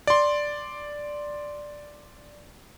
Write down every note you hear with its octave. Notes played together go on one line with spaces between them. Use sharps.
D5 C6